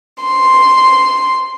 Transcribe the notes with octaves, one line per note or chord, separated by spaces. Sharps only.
C6